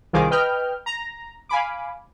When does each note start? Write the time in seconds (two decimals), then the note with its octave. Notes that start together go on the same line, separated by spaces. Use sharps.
0.13 C2 D#3 F4 G#4 C5 D6
0.31 B4 D#5 G5 F6 G6
0.86 A#5
1.49 F5 G#5 B5 D6